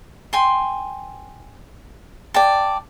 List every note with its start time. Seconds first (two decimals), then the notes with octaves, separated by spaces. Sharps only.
0.33 G5 G#5 C6
2.34 D5 G5 A5